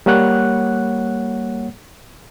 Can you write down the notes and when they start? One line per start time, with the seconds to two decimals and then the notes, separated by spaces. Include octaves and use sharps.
0.06 G3 A#3 C#5 F#5 F#6